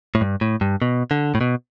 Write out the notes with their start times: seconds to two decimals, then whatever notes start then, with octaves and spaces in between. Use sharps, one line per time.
0.15 A2
0.21 G2
0.41 A2
0.61 G2
0.82 B2
1.11 D3
1.35 A2
1.41 B2